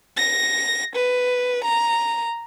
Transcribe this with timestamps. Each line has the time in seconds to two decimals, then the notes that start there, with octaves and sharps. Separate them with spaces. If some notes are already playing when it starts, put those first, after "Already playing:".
0.17 A#6
0.96 B4
1.64 A#5